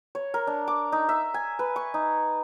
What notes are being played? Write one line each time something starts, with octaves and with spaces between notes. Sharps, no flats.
C#5
A#4
D4
D6
D#4
E5
G#5
B4
C#6
D#4